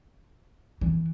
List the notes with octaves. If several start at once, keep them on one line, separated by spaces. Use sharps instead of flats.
E3